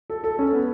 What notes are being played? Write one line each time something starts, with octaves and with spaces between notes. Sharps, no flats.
A4
A4
C#4
B3